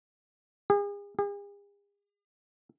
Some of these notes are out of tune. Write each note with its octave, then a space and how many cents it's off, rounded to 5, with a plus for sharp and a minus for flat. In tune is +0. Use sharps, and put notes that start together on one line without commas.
G#4 -40
G#4 -45